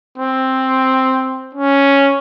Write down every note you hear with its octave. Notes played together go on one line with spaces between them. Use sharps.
C4
C#4